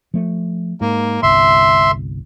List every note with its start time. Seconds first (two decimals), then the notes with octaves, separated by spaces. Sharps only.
0.14 F3 A3
0.81 G#2 A#3
1.23 G1 C2 E5 C6